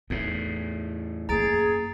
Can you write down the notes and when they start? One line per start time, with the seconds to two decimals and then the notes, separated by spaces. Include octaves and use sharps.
0.10 E2 A2 D#4
1.29 F#2 A#3 G#4 A#5 A6 D7